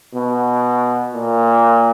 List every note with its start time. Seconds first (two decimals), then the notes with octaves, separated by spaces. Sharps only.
0.15 B2
1.14 A#2